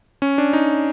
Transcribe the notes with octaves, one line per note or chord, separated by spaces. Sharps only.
C#4
D4
D#4